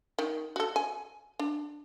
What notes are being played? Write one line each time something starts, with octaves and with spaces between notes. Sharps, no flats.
D#3
F#4 A4
G#5
D4